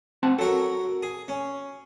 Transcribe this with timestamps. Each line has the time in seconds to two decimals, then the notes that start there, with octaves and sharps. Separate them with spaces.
0.23 C4 F#5 A5
0.39 F#3 F#4 A4 A#4
1.02 G#4
1.28 C#4